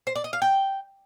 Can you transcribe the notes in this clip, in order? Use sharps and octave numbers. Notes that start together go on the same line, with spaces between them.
C5
D5
D#5
F5
G5